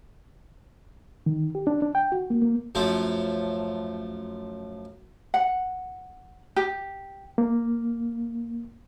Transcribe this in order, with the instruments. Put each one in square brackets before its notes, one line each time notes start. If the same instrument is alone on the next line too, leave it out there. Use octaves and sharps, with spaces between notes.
[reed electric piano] D#3
G4
D4
D4
G5
F#4
A#3
A#3
[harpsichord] F#2 F3 A3
[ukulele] F#5
G4
[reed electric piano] A#3